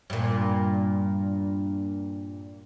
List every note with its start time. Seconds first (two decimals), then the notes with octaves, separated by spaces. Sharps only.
0.10 G2 A#2